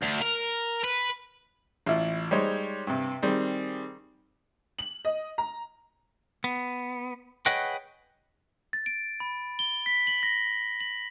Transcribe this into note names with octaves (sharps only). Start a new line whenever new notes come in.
D2
A#4
B4
A1 E4 F4
G3 G#3 D#4 C5 C#5
G2 C3
D#3 G3 C4 G#4
F#7
D#5
A#5
B3
G#4 B4 C#5 D#5 F#5 G5
A6
D7
B5
G7
B6
F#7
A#6
F#7